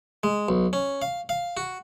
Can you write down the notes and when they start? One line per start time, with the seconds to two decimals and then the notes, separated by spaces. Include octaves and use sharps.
0.23 G#3
0.49 B1
0.73 C#4
1.02 F5
1.29 F5
1.57 F#4